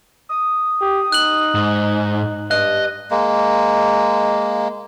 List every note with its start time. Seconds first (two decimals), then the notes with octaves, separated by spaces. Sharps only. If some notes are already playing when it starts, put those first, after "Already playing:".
0.29 D#6
0.81 G4
1.12 D#4 F#6 F#7
1.55 G#2
2.51 G2 D#5 F#6
3.11 G#3 A#3